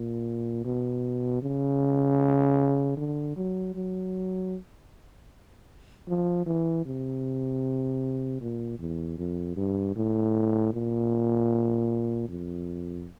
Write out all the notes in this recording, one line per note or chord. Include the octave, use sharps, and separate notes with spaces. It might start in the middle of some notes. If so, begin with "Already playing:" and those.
Already playing: A#2
B2
C#3
D3
F#3
F#3
F3
E3
C3
A#2
E2
F2
G2
A2
A#2
F2